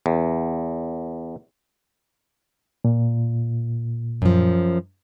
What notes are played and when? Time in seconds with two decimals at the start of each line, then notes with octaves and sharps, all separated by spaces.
0.06 E2
2.85 A#2
4.22 F#2 F3